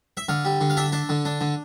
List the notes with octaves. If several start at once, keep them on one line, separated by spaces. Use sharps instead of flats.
E5
D3 F5
G3
D3
F5
D4 E5
D4
D3
D4
D3